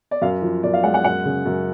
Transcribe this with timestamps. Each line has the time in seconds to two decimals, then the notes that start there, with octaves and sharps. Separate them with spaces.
0.11 D5
0.22 F#2 F5
0.42 F3
0.63 F#2 D5
0.74 F5
0.84 G#3 F#5
0.94 F#5
1.04 F#2 F#5
1.25 C#3
1.46 F#2